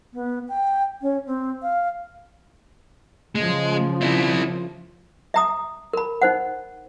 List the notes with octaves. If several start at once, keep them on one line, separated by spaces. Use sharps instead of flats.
B3
G5
C#4
C4
F5
C#3 F3 G#3
C4 E4
E5 A#5 D#6
A#4 B5
D#4 C5 F#5